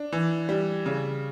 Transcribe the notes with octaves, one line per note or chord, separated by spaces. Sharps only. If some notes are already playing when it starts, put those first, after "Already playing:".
Already playing: D4
E3
G3
C#3